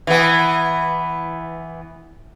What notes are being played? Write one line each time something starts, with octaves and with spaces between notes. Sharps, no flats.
E3 B3